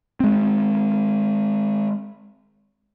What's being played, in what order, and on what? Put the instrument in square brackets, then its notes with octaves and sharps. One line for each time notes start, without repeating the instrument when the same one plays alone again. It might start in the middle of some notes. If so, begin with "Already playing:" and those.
[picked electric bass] G#3 C4